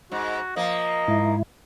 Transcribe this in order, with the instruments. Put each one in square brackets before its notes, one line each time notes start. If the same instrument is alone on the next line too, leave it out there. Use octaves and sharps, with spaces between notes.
[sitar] G#2 [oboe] F#4
[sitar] F3 A#3 [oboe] D#5
[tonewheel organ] G#2 E4